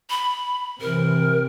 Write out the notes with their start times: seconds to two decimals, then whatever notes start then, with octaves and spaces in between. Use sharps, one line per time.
0.10 B5
0.81 C3 E3 A#4